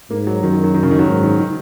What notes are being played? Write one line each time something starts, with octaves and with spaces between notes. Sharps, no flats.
G#2 A#3
F#3
F#2 D#3
D#3
F#3
D#3
C#3
D#3
F#3
G#2 D#3
D#3
D#3